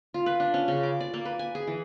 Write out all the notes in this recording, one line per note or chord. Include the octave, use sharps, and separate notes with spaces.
F4
B4
D4
C#4
C#3
D6
D5
A#3
B4
G#5
G#4
E3